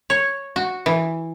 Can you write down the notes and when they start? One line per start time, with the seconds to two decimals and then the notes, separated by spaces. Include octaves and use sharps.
0.10 C#5
0.56 F#4
0.86 E3